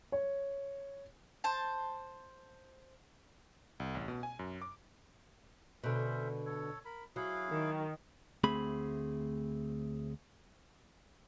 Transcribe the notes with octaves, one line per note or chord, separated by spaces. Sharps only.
C#5
C5 A5
C2
A1
B2
G#5
F#2
D6
B2 D3 C#4 C5 E5
A4 C#5
A#4 B5
F#3 E4 G#4 F5
D#3
D2 A3 C4 G#4 B5